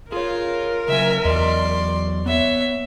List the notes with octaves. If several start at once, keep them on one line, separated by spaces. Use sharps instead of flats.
F4 G#4 A#4 C#5
C#3 F#3 E5 G#5
E2 E3 F#3 D5 D#5 C6
B3 C#5 E5